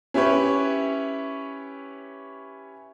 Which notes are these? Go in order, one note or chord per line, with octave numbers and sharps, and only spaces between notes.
C#4 E4 G4 B4 C#5